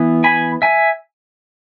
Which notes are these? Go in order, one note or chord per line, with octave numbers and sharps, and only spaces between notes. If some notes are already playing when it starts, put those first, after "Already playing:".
Already playing: E3 B3
G#5 B5
E5 G#5